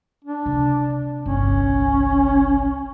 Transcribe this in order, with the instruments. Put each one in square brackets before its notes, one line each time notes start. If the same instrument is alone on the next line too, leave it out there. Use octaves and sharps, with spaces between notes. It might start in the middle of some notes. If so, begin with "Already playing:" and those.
[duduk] D4
[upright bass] C3
[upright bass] G1 C2 [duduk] C#4